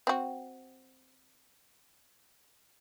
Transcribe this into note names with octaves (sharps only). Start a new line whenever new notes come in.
C4 F#4